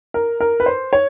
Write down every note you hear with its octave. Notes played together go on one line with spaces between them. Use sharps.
A#4
A#4
B4
C5
C#5